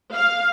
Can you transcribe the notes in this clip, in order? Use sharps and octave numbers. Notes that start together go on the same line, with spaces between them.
F5